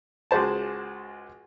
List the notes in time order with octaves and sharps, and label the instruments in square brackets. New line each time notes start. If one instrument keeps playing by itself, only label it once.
[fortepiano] C#2 G#3 F#4 C5 A5